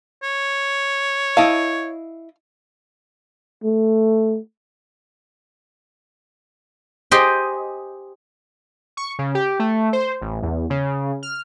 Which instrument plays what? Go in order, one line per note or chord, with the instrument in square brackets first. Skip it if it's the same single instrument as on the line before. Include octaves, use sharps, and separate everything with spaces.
[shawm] C#5
[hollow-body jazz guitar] E4 D#5 A5 [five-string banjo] F5
[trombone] A3
[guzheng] G4 G#4 C5 D#5 G#5
[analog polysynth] C#6
C#3
G4
A3
C5
A1
E2
C#3
F6